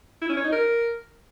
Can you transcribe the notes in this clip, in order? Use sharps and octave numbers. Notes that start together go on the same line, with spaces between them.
E4
C#4
C#5
D#4
A#4